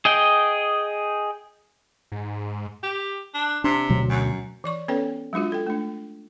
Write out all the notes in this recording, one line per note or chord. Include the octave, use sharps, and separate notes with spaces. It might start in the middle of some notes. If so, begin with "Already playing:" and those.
G#4 D#5 G5
G#2
G4
D4
C3 D4
D2 B2 F#3
F#2
E3 D5 C#6
B3 C#4 A4 B4 C#5 G5
F#3 G#3 D4 F4 F#4
A4 G5
A3 D4